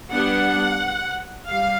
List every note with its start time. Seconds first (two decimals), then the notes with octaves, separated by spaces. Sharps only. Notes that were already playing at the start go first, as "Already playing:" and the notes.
0.11 G3 B3 D4 F#5
1.49 G3 F5